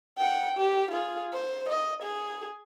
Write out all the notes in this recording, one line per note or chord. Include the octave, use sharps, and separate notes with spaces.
F#5 G5
G4
F4 G#4
C5
D#5
G#4